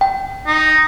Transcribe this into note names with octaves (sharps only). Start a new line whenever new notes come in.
G5
D#4